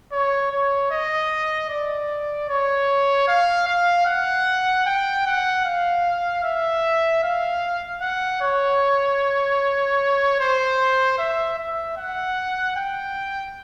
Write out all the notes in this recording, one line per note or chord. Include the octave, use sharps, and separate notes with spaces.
C#5
C#5
D#5
D5
C#5
F5
F5
F#5
G5
F#5
F5
E5
F5
F#5
C#5
C5
E5
E5
F#5
G5